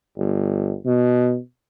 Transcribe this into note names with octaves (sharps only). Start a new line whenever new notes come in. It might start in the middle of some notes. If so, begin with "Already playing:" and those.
G1
B2